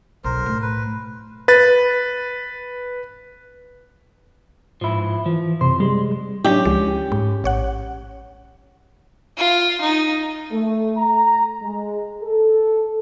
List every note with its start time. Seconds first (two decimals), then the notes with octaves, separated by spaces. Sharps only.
0.24 B1 A#4 C5
0.46 A2
0.62 B4
1.48 B4 A6
4.81 G#2 F3 E4
5.26 E3 F3
5.61 F#2 C3 C5
5.80 G3 G#3
6.44 F#3 C#4 D4 E4 G4
6.65 C#2 F3 G#3
7.12 G#2
7.44 A1 C#5 F#5
9.37 F4
9.81 D#4
10.51 A3
10.97 A#5
11.62 G#3
12.23 A4